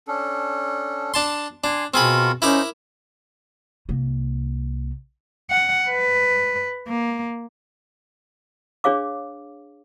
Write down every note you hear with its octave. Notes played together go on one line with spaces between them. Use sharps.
C#4 D4 A4
D4 A5 C6
D4 G#5 C6
B2 C4 F4 G#4 A#4 B5 C#6
C#4 D#4 E4 A#4 C5 D6
C2 A#3
F#5
B4
A#3
D4 G#4 C#5 F5 D6